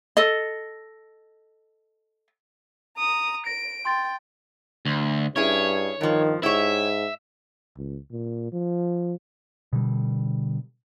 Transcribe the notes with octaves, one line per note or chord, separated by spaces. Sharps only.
A4 D#5
A#5 D#6
A#6 D7
G5 C6 A6
D2
G2 C#4 E4 G#4 C#5
G2 D#3 F3
G#2 E4 G4 C#5 E5
C#2
A#2
F3
B2 D3 G3